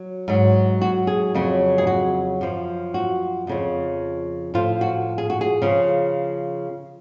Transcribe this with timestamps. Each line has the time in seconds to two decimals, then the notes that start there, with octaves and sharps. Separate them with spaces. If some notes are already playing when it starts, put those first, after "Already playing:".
Already playing: F#3
0.28 G#2 F#3
0.81 F#4
1.07 G#4
1.34 F2 C#3 F#3
1.78 G#4
1.87 F#4
2.41 F#2 F3
2.94 F#4
3.47 F2 C#3 F3
4.54 A2 F3 F4
4.81 F#4
5.18 G#4
5.30 F#4
5.41 G#4
5.62 C#3 F3